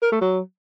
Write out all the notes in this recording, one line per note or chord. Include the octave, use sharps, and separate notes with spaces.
A#4
A3
F#3